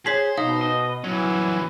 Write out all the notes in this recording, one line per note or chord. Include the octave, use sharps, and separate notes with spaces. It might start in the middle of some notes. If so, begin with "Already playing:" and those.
G#4 C5 C#5 B6 F#7
B2 D#4 F5
D#5
E2 E3 F#3 C#4